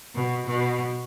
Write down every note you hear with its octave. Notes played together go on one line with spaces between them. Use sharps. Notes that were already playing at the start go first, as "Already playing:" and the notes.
B2
B2